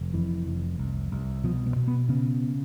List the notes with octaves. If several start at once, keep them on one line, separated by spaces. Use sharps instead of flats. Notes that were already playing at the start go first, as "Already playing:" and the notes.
Already playing: F1
F2 E3
F1
C2
C2
B2 F3
B3
B2
B3
C#3 B3